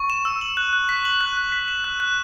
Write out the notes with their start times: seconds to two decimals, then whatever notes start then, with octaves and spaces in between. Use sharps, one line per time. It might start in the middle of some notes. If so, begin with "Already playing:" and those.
Already playing: C#6
0.10 E7
0.25 E6
0.41 F#7
0.57 F#6
0.73 F#6
0.89 B6
1.05 F#7
1.21 F#6
1.37 F#6
1.52 B6
1.68 E7
1.84 F#6
2.00 F#6